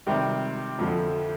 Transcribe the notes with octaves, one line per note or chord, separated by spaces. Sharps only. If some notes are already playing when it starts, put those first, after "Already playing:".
C3 D#3 G3 C4
F2 D3 F3